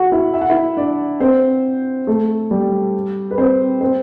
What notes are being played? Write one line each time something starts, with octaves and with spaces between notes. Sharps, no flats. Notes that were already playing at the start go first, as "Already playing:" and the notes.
Already playing: F#4 F#5
E4 E5
E5
F#5
E4 E5
D4 D5
C4 C5
A3 A4
G3 G4
B4
C4 C5
C4 C5